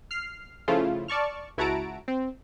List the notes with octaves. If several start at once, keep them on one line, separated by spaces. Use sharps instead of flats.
F6 C7
C#3 F3 A3 E4 F4
D5 A5 C#6 F6
C#2 E4 F#4 A5 A#5 D7
C4